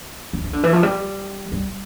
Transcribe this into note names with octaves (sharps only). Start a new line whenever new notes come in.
E3
E3
D3
E3
F3
G3
G3